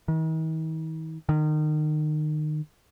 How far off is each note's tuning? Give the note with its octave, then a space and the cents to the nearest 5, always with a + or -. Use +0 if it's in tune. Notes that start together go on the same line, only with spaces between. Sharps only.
D#3 +45
D#3 -30